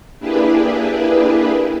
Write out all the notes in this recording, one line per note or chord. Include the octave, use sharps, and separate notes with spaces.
A#3 D4 E4 G4 G#4 B4